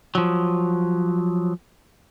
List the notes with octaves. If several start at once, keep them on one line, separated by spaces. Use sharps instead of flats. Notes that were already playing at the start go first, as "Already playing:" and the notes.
F3 F#3